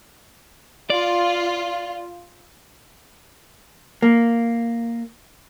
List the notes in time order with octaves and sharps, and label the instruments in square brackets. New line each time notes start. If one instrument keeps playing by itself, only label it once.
[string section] F4 [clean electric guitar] D5
[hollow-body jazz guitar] A#3